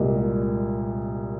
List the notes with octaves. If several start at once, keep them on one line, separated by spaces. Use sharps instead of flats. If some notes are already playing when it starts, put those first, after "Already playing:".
Already playing: C2 A#2 G#3